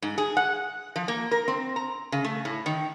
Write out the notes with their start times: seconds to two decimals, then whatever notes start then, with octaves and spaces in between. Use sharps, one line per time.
0.02 G#2
0.18 G#4
0.37 F#5
0.96 F3
1.08 A#3
1.31 A#4
1.48 C4
1.76 A#5
2.12 C#3
2.24 A3
2.45 A2
2.66 D#3